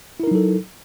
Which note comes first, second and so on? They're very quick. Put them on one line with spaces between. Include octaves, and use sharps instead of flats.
E4 A#4 D#4 F#3 A4